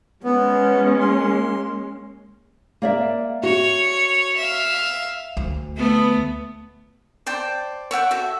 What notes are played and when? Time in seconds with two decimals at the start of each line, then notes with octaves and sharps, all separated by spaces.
0.24 G#3 B3 C#4
1.00 A#3 C6
2.82 A#3 D5 E5
3.43 F#4 C#5
4.37 E5 F5
5.37 D2
5.76 A3 B3
7.26 C5 D5 G5 A5
7.91 C#5 E5 F#5 G5
8.11 F#4 A4 E5